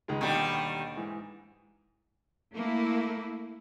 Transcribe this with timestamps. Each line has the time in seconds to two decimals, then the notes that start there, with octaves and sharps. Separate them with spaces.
0.08 C#2 D#3 G#3
0.21 D#2 B2 D3 D#3 G3
0.97 G#2 E3
2.55 A3 A#3 E4